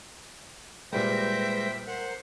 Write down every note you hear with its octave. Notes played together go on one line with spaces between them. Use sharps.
A#2 G3 G#3 B4 C5 E5 G5 A#6
A#4 C5 F#5